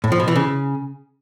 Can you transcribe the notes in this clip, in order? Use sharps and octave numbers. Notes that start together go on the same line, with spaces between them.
A2
F3
B2
E3
C#3